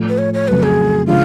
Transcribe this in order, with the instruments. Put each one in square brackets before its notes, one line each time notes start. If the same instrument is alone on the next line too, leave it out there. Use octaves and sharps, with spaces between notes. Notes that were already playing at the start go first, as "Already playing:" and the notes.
Already playing: [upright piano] A2 F3 A3
[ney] B4
C#5
C#5
[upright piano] F2 C#3 F#3 A3 [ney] B4
[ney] G#4
[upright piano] C#3 F3 G#3 D4 [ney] F4